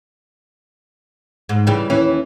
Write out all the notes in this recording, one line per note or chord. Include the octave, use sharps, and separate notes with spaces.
G#2
C#3 E3 G3
D#2 E3 C#4